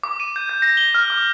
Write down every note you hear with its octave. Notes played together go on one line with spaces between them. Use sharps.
D6
D#7
G6
G6
A#6
G7
F6
D6